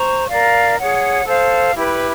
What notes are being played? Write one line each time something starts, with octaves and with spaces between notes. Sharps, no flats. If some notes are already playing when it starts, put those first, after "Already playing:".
Already playing: C5 A#5 C#6
A#4 D5 F5
G#4 C#5 F#5
A4 C5 F5
E4 G4 B4